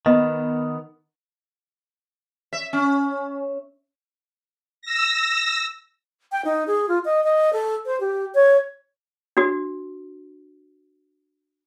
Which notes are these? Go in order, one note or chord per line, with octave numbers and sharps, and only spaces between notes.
D#3 B3 D#5
E5
C#4
E6 A#6
G5
D#4
G#4
F4
D#5
D#5
A4
C5
G4
C#5
D4 F#4